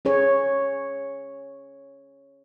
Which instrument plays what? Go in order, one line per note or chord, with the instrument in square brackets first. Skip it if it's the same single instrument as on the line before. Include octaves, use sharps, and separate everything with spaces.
[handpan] C#4 G#4 C#5